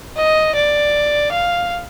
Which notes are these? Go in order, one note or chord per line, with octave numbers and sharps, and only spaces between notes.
D#5
D5
F5